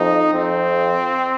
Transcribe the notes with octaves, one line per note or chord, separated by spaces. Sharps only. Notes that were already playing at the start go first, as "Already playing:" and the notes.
Already playing: F2 D#4
F2 C4